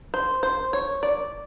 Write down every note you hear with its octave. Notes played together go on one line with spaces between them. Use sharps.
C5
C5
C#5
D5